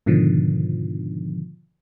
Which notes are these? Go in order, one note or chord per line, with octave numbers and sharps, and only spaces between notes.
G#2 B2 D3 D#3 F3